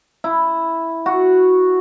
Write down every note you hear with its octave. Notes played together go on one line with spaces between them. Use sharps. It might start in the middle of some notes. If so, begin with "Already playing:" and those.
E4
F#4